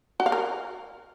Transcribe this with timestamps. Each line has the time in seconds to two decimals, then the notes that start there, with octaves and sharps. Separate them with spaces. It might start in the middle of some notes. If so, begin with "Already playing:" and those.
0.20 F#4
0.26 F5
0.32 A#4